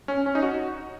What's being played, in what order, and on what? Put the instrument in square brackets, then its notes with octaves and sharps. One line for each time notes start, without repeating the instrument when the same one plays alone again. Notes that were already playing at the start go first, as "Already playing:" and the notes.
[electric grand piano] C#4
C#4
D#4
F#4